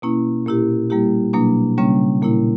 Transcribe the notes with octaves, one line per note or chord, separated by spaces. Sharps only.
B2 A#3 C#4 E4
A#2 A#3 E4 G4
G3 A#3 E4 G4
B2 F#3 A#3 D4
C#3 G3 A#3 C#4
A#2 A#3 E4